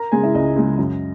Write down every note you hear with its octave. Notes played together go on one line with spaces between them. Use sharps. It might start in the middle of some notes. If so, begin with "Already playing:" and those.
Already playing: A#4 A#5
C#3 G#3 G#4 G#5
E4 E5
C#2 D#5
C#3 G#3
F#2